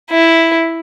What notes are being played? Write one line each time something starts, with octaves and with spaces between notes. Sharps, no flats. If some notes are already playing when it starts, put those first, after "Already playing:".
E4